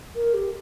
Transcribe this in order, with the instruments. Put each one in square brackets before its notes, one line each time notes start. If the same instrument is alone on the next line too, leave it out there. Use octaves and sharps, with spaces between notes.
[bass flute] A#4
G4